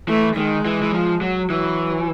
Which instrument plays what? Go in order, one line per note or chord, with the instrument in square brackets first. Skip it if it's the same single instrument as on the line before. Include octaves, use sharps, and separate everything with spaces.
[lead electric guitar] E3 [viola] A3
[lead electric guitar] D#3 [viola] G#3
[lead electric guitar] E3
E3
F3
F#3
[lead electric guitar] E3 [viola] F#3